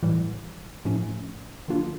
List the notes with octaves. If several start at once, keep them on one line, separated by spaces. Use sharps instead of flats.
A2 E3 G3
A2 F3 A3 C#4
D#3 F#3 A#3 D4 F4